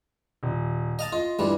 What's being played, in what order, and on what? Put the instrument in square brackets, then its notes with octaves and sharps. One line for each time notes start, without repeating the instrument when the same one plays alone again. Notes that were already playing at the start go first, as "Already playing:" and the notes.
[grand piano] D#1
[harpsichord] D#5 F5 A5
[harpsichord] F4 [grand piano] D#5
[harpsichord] G2 E3 G3 [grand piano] F4